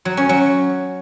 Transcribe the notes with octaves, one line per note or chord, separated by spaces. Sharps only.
F#3
C#4
F#3